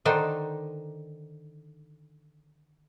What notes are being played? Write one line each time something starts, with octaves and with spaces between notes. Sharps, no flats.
D3 D#3 D4 D#4 C5